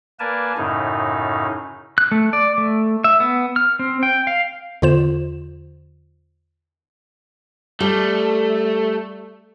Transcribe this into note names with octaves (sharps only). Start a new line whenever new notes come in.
A#3 A#4 B4 D5 G#5 A5
F#2 A2 C#3 D#4
F#6
A3
D5
A3
E5
B3
F6
C4
G5
F5
E2 D3 F4 C5 E7
G3 A3